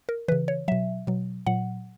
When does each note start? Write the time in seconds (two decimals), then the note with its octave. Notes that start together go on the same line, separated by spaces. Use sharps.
0.09 A#4
0.28 E3 B4
0.32 C#3
0.48 C#5
0.68 B2 F#3 E5
1.07 B2 F#3
1.47 A#2 F#3 F#5